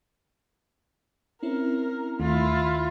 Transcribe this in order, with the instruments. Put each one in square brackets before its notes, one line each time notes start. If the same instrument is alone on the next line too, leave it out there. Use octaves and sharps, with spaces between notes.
[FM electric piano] C4 C#4 E4 [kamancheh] A#4
[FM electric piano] D#2 D#3 A3 [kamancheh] E4 F4